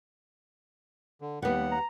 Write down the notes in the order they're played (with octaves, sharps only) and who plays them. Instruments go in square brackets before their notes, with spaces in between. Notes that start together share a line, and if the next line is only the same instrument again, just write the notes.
[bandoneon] D3
[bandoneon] D#2 F#5 [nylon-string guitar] G3 B3
[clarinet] A#5